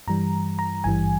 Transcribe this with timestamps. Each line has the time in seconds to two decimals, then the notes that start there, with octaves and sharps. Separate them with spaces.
0.07 G2 E3 G3 A#5
0.59 A#5
0.84 G#1 G2 E3 G3 G#5